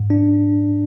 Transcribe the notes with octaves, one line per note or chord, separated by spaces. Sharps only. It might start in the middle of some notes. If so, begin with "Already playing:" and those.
Already playing: G#2
D4